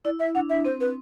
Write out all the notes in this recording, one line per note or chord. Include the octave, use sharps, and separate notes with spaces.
E4 D5
E5
D4 F#5
E5
C4 C5
B4